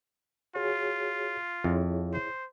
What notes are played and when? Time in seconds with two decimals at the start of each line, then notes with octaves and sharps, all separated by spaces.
0.55 F4 F#4 G#4 C#5
1.64 F2 E4 G#4 C#5
2.14 C5